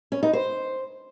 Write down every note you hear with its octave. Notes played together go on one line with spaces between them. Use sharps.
C#4
D#4
C5